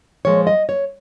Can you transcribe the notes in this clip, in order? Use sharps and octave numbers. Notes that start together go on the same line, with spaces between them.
A#2 F3 G#3 C#5
D#5
C#5